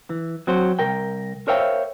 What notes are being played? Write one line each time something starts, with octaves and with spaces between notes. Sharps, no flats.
E3
F#3 C4 F#4 C5
C2 A#4 G5
A#4 C5 C#5 E5 F5 G5